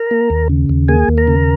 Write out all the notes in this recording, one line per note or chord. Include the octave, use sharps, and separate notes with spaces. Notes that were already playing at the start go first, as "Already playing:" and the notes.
Already playing: A#4 A#5
A#3
D#2
C#3
D#2
A#3 G#4 G#5
D#2
A#4 A#5
C#3